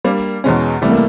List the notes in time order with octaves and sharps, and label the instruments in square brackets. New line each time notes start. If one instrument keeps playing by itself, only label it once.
[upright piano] G3 A#3 D4
E2 B2 G#3 C#4
[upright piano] C3 E3 G3 B3 [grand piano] A3
[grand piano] A#3